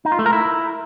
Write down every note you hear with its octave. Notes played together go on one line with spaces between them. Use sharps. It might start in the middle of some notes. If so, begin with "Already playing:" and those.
D#4
F4
A3
A#4
E4